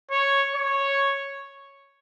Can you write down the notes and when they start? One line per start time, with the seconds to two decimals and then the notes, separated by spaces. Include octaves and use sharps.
0.11 C#5
0.55 C#5